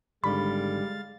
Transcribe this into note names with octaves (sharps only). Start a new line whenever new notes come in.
G#1 G#2 D3 G3 G#3 F5 B5 A6